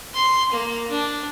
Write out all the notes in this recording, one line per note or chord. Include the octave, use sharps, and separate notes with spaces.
C6
A#3
D4